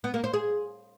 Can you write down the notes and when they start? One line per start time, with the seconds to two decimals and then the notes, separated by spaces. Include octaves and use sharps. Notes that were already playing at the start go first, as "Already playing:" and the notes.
0.04 B3
0.14 A#3
0.24 C5
0.34 G#4